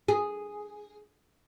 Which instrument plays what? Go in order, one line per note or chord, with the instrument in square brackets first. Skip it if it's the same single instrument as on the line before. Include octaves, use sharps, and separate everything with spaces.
[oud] G#4